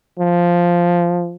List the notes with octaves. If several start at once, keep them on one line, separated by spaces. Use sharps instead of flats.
F3